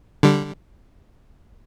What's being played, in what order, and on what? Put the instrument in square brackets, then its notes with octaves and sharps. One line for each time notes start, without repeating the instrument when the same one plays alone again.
[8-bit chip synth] D3 G3